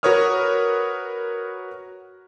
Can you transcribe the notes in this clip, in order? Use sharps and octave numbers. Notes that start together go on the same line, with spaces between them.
F#4 A#4 B4 C#5 D#6 F6